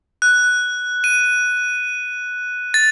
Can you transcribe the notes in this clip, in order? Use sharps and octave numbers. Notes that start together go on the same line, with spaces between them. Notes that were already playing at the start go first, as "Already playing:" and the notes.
F#6
D#7
A6